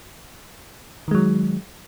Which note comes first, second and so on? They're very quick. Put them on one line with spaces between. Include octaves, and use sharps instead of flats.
D#3 G#3 F#3